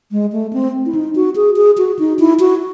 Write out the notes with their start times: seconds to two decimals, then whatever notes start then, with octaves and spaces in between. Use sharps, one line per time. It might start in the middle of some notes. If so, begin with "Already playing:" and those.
0.12 G#3
0.32 A3
0.53 C4
0.86 E4
0.95 D#4
1.15 F#4
1.36 G#4
1.56 G#4
1.78 F#4
1.99 D#4
2.19 E4
2.40 F#4